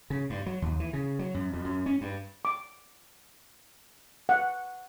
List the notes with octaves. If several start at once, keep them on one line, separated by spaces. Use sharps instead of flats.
C#3
G2
F#3
D#2
E3
C#3
F#3
F#2
F2
F#2
C#4
G2
D6
F#5